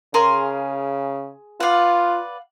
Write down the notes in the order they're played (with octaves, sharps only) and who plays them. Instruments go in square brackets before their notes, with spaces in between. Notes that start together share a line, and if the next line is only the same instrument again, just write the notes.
[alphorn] C#3 [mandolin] G#4 C6 [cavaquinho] A#4 F5
[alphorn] F4 [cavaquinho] B4 D5 [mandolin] F5 F#5